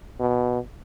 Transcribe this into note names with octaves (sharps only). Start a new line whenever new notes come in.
B2